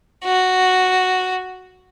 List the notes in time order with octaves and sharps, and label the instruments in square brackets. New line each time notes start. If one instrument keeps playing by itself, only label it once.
[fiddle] F#4